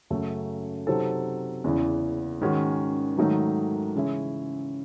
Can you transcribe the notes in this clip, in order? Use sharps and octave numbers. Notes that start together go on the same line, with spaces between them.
F#2 C#3 F#3 A3 C#4
C3 F#3 C4 D#4 A4
E2 C#3 E3
G#2 D#3 G#3 C#4 F#4
G#2 D#3 F#3 A3 D#4
C#3 E3 G#3 C#4 E4